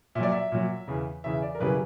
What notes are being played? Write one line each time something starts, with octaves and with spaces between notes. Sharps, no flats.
A#2 F#3 D5 E5
E5
A#2 F#3
E2 C#3 E3
E2 C#3 E3 E5
D5
A#4
F#2 C#3 E3 G3 B4